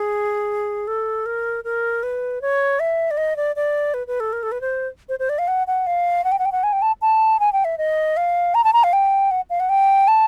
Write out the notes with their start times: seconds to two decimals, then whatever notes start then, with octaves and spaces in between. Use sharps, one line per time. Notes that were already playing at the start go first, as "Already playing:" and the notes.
Already playing: G#4
0.87 A4
1.26 A#4
1.64 A#4
2.03 B4
2.42 C#5
2.80 E5
3.11 D5
3.17 D#5
3.36 D5
3.56 D5
3.94 B4
4.07 B4
4.20 A4
4.33 A#4
4.43 A4
4.52 B4
4.61 C5
5.09 C5
5.19 C5
5.29 D5
5.39 F5
5.48 F#5
5.67 F#5
5.87 F5
6.24 F#5
6.32 G5
6.39 F#5
6.45 G5
6.52 F#5
6.63 G#5
6.73 G5
6.82 A5
7.02 A5
7.40 G#5
7.53 G5
7.65 E5
7.78 D#5
8.17 F5
8.55 A#5
8.64 A5
8.73 A#5
8.84 F5
8.93 G5
9.31 F#5
9.50 F5
9.60 F#5
9.69 G5
10.08 A5